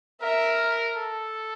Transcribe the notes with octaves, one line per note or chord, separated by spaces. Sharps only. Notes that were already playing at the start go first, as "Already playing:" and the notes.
A#4 E5
A4